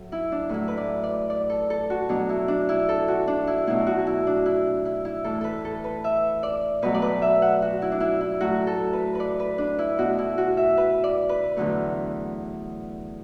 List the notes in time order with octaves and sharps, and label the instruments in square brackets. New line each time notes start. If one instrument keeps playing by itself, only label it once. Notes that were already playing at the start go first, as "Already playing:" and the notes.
Already playing: [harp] A2 F#3 A3
E4
D4
A2 F#3 A3 E4
B4
D5
D5
D5
A4
A4
F#4
B2 F#3 A3 D4
E4
D4
E4
A4
F#4
D4
E4
B2 F#3 A3 E4
F#4
E4
D4
E4
E4
E4
A2 E3 A3 A4
A4 B4
A4
B4
E5
D5
B2 F#3 A3 B4
D5
B4
E5
F#5
F#4
E4
D4
E4
E4
A2 F#3 A3 F#4
A4
B4
B4 D5
B4
D4
E4
B2 A3 F#4
E4
F#4
E5
B4
D5
B4
E2 D3 F#3 A3